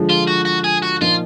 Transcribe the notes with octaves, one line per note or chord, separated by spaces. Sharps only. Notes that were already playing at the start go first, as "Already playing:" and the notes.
Already playing: D3 F3 G#3
F4
F#4
F#4
G#4
F#4
A#2 F3 A#3 D#4 F4